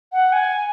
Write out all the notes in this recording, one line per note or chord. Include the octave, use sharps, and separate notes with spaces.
F#5
G#5